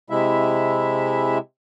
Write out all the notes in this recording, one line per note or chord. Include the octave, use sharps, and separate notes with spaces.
C3 G#3 E4 E5